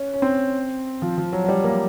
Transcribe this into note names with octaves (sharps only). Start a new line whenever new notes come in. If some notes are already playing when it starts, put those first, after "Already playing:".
Already playing: C#4
C#4
C4
F3
F3
F#3
F#3
G3
A#3